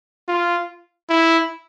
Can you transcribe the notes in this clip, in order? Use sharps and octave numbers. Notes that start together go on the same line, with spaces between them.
F4
E4